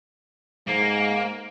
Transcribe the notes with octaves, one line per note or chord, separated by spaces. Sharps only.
G#2 A#3